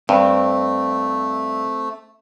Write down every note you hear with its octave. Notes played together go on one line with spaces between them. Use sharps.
G2 A3 C4